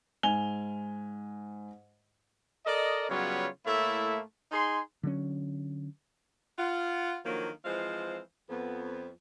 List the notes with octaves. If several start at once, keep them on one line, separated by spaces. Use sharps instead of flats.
G#2 G#5 F7 G7
A4 A#4 D5 D#5
C#3 F#3 G3 B3 F4 C#5
A2 A3 A#3 E4 A4 E5
D#4 G#4 G#5 C6
D3 F#3 C#4
F4 F#5
D3 D#3 F3 F#3 A#3
E3 F3 G#3 C4 C5 F5
F2 B3